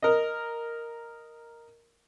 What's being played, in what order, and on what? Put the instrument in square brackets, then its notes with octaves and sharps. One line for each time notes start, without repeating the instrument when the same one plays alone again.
[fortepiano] A#4 D#5